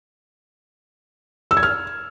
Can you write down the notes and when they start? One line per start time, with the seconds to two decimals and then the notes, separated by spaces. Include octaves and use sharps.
1.51 E6
1.57 G#6
1.63 F6